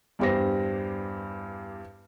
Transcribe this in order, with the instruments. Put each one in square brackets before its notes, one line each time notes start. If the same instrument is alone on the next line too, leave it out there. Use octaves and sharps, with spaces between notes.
[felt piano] E2 G2 G4 C5 A#6